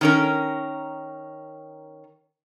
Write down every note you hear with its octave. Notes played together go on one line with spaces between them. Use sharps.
D#3 C#4 A#4